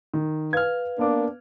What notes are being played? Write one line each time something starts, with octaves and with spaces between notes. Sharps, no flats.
D#3
B4 F5 F6 G#6
A#3 B3 D4 D6